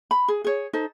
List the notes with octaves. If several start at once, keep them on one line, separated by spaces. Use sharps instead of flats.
B5
G#4
G#4 C#5
D#4 A4 C5